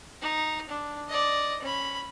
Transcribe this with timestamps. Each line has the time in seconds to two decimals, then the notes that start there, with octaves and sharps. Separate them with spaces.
0.22 D#4
0.69 D4
1.09 D5 D#5
1.62 C#4 B5